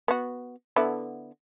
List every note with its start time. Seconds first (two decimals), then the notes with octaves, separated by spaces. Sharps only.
0.08 B3 F#4
0.76 D3 B3 E4